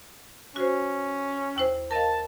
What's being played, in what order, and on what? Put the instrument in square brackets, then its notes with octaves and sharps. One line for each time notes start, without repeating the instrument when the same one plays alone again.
[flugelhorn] C#4 [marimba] F#4 C5
[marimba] D#2 E4 C5
[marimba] A#4 D#5 F5 [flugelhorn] A5